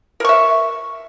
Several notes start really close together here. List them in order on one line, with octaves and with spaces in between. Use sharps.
A#4 C#6 E5